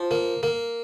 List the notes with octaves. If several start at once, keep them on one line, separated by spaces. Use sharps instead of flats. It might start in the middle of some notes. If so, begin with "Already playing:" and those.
Already playing: F3
A#3
A#3